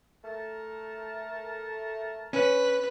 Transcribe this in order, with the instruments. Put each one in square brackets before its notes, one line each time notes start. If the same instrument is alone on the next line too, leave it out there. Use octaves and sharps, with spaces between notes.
[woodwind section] A3 A#4 A5
[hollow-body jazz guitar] C#4 [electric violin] B4